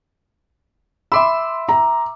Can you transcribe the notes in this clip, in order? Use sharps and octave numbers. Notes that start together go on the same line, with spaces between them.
E5 B5 C6 D6 E6
A#5